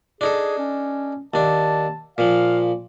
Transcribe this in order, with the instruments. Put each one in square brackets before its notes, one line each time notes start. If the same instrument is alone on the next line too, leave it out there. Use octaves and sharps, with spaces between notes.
[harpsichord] D4 D#4 A4 [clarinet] G#4
[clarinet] C#4
[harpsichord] D#2 D4 [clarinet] A5
[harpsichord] A#2 F3 [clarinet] F5